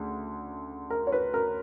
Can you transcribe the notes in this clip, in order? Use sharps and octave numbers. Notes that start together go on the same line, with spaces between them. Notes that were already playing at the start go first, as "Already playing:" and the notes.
Already playing: D2 C#3
A#4
C#5
B4
A#4